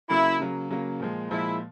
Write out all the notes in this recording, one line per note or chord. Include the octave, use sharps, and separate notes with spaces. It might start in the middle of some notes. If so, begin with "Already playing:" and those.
C#3 F#3 A#3 E4
C#3 F#3 A#3
C#3 F#3 A#3
A#2 F3 G#3
A#2 F3 G#3 E4